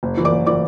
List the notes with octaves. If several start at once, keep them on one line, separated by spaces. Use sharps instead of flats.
F#1
E3
D5 D6
F#1
E3 D5 D6